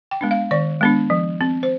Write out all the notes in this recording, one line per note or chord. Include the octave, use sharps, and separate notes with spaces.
G5
G#3 B3 D4
F5
D#3 D5
G#3 B3 D4
F3
C4
C5